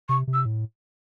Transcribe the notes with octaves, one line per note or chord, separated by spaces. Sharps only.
C3 C#6
C3
E6
A2